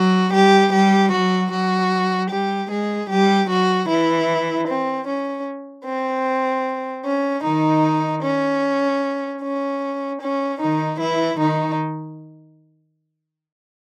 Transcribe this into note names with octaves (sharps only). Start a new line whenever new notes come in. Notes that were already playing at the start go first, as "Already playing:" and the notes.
Already playing: F#3 F#4
G3 G4
G3 G4
F#3 F#4
F#3 F#4
G3 G4
G#3 G#4
G3 G4
F#3 F#4
E3 E4
C4
C#4
C4
C#4
D#3 D#4
C#4
C#4
C#4
D#3 D#4
E3 E4
D#3 D#4